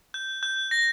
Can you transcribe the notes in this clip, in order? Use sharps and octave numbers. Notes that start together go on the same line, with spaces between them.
G6
G6
A#6